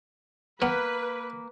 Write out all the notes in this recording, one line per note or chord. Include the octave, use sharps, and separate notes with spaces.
A#3 B3 B4